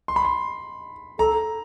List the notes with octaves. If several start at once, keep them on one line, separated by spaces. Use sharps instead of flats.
C6
B5
C6
A4 A#5